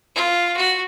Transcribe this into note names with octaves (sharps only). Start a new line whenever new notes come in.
F4
F#4